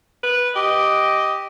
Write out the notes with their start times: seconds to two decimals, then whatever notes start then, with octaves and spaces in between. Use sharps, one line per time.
0.23 B4
0.56 G4 D#5